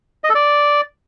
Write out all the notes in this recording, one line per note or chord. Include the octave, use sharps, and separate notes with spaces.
D#5
A4
D5